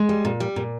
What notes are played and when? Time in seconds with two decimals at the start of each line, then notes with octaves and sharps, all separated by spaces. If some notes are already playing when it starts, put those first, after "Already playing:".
Already playing: G#3
0.09 G3
0.25 A#2
0.40 G3
0.56 A#2